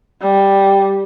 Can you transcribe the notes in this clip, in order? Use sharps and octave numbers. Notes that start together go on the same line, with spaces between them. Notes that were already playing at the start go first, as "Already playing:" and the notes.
G3